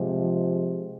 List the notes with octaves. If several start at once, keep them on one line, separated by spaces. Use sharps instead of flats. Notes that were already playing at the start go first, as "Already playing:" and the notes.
Already playing: C3 F3 G#3